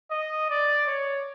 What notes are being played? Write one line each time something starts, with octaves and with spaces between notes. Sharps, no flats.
D#5
D5
C#5